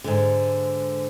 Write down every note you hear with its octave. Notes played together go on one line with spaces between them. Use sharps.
G#2 D3